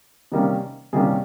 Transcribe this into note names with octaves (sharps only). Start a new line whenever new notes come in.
C3 D#3 G3 A#3 C#4
C3 D#3 G3 A#3 C#4 G#4